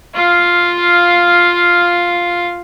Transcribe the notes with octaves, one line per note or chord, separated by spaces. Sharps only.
F4 F5